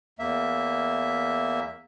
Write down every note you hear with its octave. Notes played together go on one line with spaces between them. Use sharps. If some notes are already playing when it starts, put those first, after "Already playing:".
E2 A#3 E5